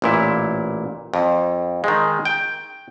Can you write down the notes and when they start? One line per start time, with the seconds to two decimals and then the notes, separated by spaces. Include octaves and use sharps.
0.02 A1 A#2 E4
1.14 F2
1.84 D#3 G#3
2.25 G5